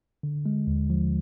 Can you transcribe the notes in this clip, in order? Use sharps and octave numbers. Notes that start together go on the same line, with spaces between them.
D3
G#3
D#2
F3